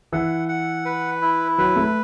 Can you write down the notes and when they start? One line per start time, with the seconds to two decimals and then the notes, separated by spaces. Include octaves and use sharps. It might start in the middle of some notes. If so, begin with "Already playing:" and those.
0.13 E3 F#5
0.48 F#5
0.85 B4
1.21 E4
1.58 F#3 B4
1.76 A3